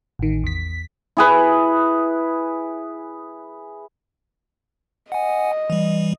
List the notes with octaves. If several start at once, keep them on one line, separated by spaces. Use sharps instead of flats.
A1 D#3
E2 B6
E4 G#4 B4
D#5 F#5 G#5
E3 G3